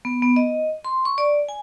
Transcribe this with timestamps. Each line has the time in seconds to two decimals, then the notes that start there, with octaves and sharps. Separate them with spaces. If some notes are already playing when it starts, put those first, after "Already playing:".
0.05 B3
0.22 B3
0.36 D#5
0.85 C6
1.05 C#6
1.18 D5
1.49 G#5